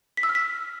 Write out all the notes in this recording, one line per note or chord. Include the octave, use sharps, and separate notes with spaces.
B6
E6
F6
B6